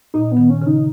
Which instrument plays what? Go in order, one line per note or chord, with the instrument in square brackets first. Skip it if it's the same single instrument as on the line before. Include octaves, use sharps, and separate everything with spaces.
[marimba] A#2 [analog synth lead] D#4
[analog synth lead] B3
[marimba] D#3
[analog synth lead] C#4
[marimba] C#3 [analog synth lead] D#4